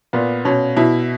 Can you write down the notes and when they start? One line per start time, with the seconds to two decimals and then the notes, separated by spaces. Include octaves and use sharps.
0.13 A#2 B3
0.45 B2 C#4
0.77 B2 E4